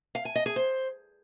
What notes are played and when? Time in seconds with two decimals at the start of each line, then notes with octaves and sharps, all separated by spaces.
0.15 F5
0.25 G#5
0.35 D#5
0.46 G#4
0.56 C5